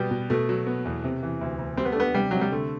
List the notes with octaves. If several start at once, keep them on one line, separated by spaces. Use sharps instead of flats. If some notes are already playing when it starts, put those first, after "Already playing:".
Already playing: B2 G3 B3
B2
B2 A3
F#3
B3
E2
C3
E3
D2
D2
G3 C4
B3
A3
B3 D4
C3 G3
C3 F#3
G3
D3 A3